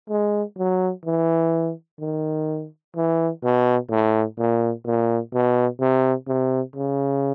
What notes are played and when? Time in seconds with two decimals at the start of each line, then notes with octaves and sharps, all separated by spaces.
0.10 G#3
0.58 F#3
1.06 E3
2.00 D#3
2.96 E3
3.44 B2
3.90 A2
4.38 A#2
4.85 A#2
5.34 B2
5.80 C3
6.28 C3
6.76 C#3